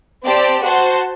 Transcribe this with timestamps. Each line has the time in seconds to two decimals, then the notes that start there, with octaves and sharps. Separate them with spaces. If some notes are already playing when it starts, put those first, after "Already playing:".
0.25 C4 G4 D5 A5
0.64 F#4 C5 F#5 A5